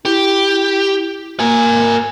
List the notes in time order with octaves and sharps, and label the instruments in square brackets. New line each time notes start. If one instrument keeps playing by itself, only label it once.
[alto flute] E4 [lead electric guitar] G4
[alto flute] A#3 [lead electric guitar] A#4 G#5